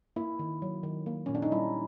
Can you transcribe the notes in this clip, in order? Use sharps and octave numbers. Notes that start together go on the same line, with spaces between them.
A#3 E4
D#3
F#3
D#3
A#3
A#2 C#4
D4
D#4
G3 E4